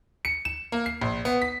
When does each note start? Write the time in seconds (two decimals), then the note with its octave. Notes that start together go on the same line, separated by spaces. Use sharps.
0.25 C#7
0.45 E7
0.72 A#3
0.86 C7
1.02 A#1
1.25 B3
1.42 B6